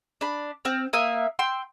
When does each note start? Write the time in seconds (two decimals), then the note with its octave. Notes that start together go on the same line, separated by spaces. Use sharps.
0.21 D4 B5
0.65 C4 F6
0.93 A#3 A#4 E5 D#6
1.39 G5 C6 E6